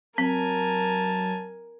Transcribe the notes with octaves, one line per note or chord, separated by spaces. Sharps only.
F#3 C4 A#4 G#5 A5